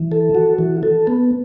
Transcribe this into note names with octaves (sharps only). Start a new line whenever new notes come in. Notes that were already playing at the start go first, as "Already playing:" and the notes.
Already playing: E3
A4
F#4
E3
A4
B3